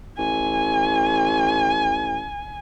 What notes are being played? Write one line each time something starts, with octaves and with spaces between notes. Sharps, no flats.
A1 G#5